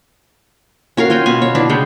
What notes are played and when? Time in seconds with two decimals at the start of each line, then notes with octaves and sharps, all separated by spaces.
0.97 C#4 F#4 A#4 F5
1.10 F4 C#5 G5 G#5
1.26 B2 B3 G#5
1.42 C#5
1.55 D4 E4 B4 D5
1.69 C#3 G#3 G5